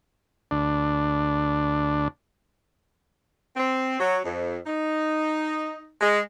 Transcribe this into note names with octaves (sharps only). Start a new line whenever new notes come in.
D2 D4
C4
F#3
F2
D#4
G#3